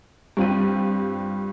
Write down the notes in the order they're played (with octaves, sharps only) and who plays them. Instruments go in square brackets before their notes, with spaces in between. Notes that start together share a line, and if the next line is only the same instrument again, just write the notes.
[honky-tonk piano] G2 G3 C4 F4 G4 D#7